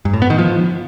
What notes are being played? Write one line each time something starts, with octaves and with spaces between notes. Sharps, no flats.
G2
A2
B3
D#3
F3